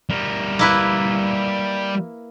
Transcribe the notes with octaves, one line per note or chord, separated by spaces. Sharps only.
G3 A#4
A#3 E4 B4